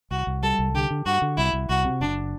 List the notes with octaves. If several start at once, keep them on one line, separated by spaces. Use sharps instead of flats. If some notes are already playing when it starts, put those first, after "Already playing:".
C2 F#4
C2
G3 A4
C2
D3 G4
D3
G2 F#4
D3
C2 E4
C2
C2 F#4
C3
F#1 D4